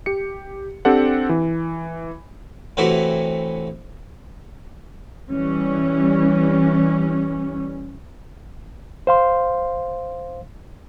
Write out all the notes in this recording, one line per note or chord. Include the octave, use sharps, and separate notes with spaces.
G4 C#7
C4 D4 G4 A4 C5 F#5
E3
A2 C3 E3 F#4
E3 G3 C#4
C5 F5 C6